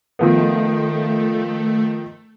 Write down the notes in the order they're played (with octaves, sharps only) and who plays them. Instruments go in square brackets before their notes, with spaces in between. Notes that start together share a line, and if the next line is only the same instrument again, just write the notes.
[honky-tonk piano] D#3 F3 B3 [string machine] A3